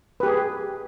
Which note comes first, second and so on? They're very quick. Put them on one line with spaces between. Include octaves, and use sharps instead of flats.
B4 G4 G#4